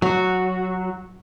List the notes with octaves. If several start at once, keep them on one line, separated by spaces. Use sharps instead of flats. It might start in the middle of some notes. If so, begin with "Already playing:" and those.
F#3 F#4